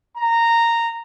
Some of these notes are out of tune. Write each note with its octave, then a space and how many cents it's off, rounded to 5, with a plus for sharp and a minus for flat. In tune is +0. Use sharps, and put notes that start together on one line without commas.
A#5 -10